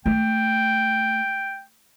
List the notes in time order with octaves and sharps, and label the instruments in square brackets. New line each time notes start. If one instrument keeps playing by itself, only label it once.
[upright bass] A3 [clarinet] G5